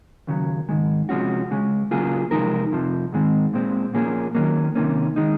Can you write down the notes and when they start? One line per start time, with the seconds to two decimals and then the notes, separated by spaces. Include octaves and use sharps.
0.27 D#2 C#3 F#3
0.69 G#2 D#3 G#3
1.09 C3 F3 G#3 C#4 F#4
1.50 C#2 C#3 G#3 C#4
1.91 C#3 F#3 A#3 F4 G#4
2.31 C3 F3 G#3 D#4 A#4
2.72 F2 C3 F3
3.12 G#2 D#3 G#3 C4
3.54 A#2 G#3 C4
3.94 A#2 F3 A#3 C#4 G#4
4.35 D#3 F#3 A#3 C#4
4.75 C3 D#3 A#3 C#4
5.16 D#3 G#3 D#4